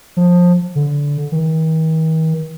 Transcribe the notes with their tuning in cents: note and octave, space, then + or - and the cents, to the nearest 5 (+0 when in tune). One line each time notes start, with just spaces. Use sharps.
F3 +20
D3 -20
D#3 +45